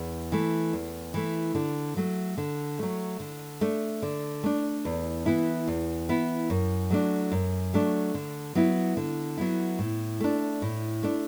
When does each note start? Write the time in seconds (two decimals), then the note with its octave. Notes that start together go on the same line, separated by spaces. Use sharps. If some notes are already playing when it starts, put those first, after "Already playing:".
Already playing: E2
0.32 E3 A3
0.73 E2
1.14 E3 A3
1.55 D3
1.97 F#3 A3
2.38 D3
2.79 F#3 A3
3.20 D3
3.61 A3 D4
4.02 D3
4.44 A3 D4
4.85 E2
5.26 E3 B3 E4
5.68 E2
6.09 E3 B3 E4
6.50 F#2
6.90 F#3 A3 D4
7.32 F#2
7.73 F#3 A3 D4
8.15 D3
8.55 F#3 B3 E4
8.97 D3
9.38 F#3 B3 E4
9.79 A2
10.20 A3 D4
10.62 A2
11.03 A3 D4